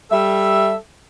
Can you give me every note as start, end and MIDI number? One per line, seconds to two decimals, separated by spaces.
0.11 0.75 55
0.11 0.75 69
0.11 0.75 76